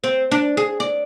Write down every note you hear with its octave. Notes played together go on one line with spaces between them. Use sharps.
C4
D4
G#4
D5